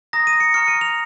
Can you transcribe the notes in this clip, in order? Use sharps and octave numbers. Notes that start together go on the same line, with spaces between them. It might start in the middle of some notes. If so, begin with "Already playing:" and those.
A#5 D#6 A#6
D#7
C#7
A#5 C#6 F6 C#7
D#7
F7